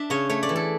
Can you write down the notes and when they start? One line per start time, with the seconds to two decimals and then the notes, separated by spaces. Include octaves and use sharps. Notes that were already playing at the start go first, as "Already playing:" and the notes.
Already playing: D4 E5
0.10 C#3 C#5
0.29 A3 C#5
0.43 D5
0.49 E3
0.56 A4